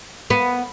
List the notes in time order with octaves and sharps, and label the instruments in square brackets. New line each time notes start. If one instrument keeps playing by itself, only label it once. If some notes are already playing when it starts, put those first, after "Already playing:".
[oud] B3